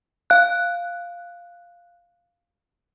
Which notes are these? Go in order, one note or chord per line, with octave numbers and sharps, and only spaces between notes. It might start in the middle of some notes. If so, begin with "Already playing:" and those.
F5 F#6